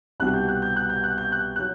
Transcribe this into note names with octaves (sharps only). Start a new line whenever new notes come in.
C2 B2 G3 F#6
G6
F#6
G6
F#6
G6
F#6
G6
F#6
F#3 F#6